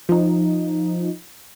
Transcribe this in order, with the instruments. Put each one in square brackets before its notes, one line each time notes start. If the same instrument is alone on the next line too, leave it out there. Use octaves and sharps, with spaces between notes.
[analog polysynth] F3 D#4